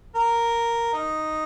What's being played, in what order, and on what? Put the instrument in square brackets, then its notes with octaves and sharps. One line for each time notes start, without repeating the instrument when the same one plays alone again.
[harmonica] A#4
D#4